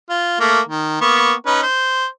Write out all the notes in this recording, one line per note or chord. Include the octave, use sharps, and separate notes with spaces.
F4
A3 A#3
D#3
A#3 B3 C#6
C#4 D#4 B4
C5